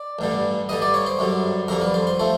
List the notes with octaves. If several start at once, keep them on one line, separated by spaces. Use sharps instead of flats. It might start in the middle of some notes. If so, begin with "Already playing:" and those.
Already playing: D5
A1 G2 D3 G3
G2 D3 G3 D#5
D5
C#5
C5
F#2 D3 G3
F2 D3 G3 A#4
B4
C5
C5
F3 A3 C5